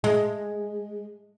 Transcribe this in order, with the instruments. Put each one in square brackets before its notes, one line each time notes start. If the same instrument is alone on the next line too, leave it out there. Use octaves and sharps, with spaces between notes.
[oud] G#3